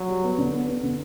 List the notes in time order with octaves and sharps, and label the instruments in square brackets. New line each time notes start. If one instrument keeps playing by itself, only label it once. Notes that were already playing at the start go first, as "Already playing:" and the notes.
Already playing: [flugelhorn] F#3
[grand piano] G3
B3
D3
B3
B3
D3